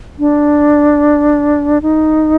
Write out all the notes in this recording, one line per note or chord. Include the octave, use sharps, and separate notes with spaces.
D4
D#4